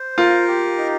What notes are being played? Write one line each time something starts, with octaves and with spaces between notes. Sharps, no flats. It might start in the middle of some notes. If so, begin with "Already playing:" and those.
Already playing: C5
F4 A#4
G4
D#4